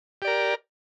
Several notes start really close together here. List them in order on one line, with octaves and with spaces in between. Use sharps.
G4 D5 A#4